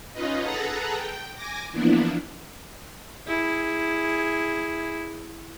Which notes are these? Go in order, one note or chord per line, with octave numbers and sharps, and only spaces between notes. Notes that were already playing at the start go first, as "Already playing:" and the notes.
C#4 D#4 F4 B4 D#5
G#4 A4 B4 F#5 A5 A#5
G5
G#5 D6 A#6
E3 F3 A#3 B3 D4 E4
E4 G#4